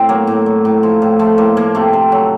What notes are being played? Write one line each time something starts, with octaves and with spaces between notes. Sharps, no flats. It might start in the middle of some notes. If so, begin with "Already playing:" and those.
Already playing: A2 C4
F#3 A#3
A2
F#3
A2
F3
A2
F3 A3
A2 A#3
F3 A#3
C3 A3
C3
F#3